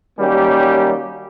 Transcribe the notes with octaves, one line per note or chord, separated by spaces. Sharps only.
D#3 F#3 G3 A#3 C#4 G4